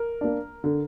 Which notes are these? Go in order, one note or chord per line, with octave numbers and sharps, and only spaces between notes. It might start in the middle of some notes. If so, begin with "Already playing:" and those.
Already playing: A#4
A#3 D4
D3